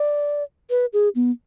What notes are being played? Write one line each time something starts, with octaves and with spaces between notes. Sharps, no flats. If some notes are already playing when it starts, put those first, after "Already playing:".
Already playing: D5
B4
G#4
B3